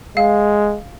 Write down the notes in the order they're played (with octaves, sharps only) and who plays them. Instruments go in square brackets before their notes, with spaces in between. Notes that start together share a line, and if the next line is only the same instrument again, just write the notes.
[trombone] G#3 [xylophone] F5